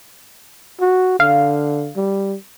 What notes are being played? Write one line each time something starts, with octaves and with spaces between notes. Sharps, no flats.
F#4
D3 F5
G3